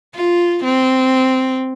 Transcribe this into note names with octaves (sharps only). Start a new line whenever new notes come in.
F4
C4